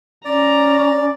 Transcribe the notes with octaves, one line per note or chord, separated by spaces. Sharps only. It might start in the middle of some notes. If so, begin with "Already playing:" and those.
C#4 D5 A#5